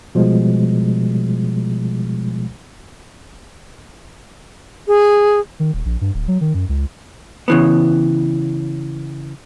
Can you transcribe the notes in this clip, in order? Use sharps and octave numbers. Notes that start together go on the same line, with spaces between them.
B2 F3 G3 G#3
G#4
D#3
D#1
A#1
G2
D1
F#3
D#3
F#2
C#2
C#3 E3 B3